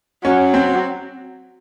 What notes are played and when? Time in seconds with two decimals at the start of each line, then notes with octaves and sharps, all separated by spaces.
0.24 F#3 C#4
0.54 C4